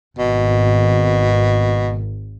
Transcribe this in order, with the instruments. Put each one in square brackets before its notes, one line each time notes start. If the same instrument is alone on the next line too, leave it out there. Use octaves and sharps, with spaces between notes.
[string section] G#1 [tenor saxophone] B2